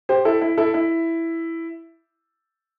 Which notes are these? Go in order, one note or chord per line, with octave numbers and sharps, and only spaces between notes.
G4 C5
E4 A4
E4
E4 A4
E4